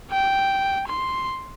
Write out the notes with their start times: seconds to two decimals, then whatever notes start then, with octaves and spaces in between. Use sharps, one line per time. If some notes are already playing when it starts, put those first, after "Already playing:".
0.11 G5
0.88 C6